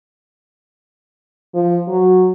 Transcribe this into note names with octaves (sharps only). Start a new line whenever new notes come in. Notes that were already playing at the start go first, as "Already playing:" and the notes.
F3
F#3